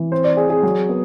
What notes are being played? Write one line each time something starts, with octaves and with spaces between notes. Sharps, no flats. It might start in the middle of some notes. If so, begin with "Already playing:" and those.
Already playing: E3
C4 C5
D5
C4 G#4
G#4
F#3
B3